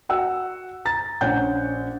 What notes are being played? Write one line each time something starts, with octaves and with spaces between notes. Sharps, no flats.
F#4 F#5 E6
A#5 A6
A#1 C#4 F#5 G6